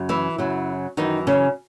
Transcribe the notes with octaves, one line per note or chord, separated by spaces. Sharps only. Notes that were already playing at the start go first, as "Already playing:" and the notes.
Already playing: F#2 C#3
E3 E4
F#2 C#3 F#3
F#2 D#3 E3 D#4
C#3 C#4